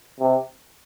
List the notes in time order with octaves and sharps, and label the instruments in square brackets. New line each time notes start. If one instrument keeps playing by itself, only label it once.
[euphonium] C3